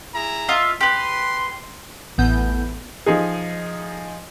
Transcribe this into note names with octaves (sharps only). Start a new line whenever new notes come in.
E4 G#4 A#5
F4 D#5 E5
G4 B4 C6
A1 E2 A2 E3 B3 G6
F3 D#4 G#4